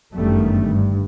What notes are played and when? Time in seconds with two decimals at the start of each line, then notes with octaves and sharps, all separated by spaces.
0.13 G1 F#2 D#3 G3 A3
0.71 G2